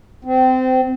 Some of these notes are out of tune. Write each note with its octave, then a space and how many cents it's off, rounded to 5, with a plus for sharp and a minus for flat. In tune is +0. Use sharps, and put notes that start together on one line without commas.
C4 -25